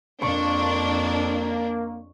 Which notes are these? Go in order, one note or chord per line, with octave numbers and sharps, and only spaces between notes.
F2 A#3 D4 C#6